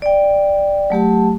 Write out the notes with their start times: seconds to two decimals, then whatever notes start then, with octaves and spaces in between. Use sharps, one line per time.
0.02 D5 G5
0.90 F#3 A3 G4 A5